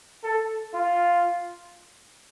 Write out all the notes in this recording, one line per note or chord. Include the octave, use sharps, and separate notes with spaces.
A4
F4